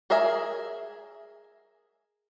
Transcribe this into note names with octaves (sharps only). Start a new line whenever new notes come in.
G#4 A#4 D#5 E5 G#5